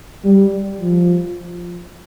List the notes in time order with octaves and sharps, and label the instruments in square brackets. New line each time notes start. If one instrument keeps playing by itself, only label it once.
[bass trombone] G3
F3